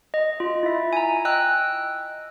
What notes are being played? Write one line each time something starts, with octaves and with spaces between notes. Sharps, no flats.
D#5
F4
E4 E5
G#5 A#5
D#5 G5 E6 F#6